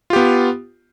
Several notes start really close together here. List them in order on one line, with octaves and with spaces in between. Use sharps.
F4 G4 B3